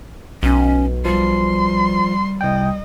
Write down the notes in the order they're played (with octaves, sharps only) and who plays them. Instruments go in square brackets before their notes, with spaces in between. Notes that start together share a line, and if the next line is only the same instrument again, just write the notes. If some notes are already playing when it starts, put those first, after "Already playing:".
[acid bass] B1 [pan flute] C#4
[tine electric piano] F3 [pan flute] G3 [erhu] C6
[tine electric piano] C2 G5 [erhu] D#5